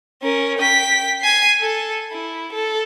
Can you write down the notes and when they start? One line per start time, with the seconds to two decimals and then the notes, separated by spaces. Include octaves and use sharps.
0.22 C#4 A#4
0.58 G5 B6
1.21 G#5 C7
1.60 A4
2.12 E4
2.52 A4